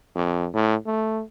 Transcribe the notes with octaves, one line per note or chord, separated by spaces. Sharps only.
F2
A2
A3